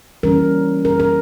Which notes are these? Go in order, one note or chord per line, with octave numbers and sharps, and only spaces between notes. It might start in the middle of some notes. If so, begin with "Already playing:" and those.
E3 G3 C#4 A#4
A#4
A#4